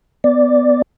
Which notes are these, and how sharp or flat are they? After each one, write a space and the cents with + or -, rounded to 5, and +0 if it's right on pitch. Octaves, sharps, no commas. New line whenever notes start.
B3 +15 D5 +0